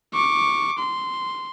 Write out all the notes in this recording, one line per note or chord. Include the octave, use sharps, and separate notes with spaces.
C#6 D6
C6